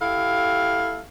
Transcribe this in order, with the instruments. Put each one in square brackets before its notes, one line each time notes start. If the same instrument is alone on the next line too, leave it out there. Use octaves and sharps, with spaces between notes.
[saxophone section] E4 G4 A4 F5